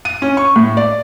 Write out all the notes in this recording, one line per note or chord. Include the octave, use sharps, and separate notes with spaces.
D#7
C#4
C#6
A2
D5